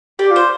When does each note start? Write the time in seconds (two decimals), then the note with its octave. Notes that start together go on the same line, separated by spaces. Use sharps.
0.19 G4 D5
0.30 F4
0.36 C5